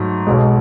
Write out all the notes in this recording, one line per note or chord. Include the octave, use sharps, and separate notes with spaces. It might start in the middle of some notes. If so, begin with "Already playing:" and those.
Already playing: G#2 F#3 A3
B1 B2 G#3